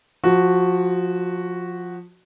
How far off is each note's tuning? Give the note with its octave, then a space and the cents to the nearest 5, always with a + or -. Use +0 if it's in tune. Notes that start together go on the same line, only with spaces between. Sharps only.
F3 +20 F#4 +0